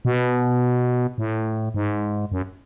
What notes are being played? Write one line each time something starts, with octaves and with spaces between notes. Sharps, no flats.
B2
A2
G#2
F#2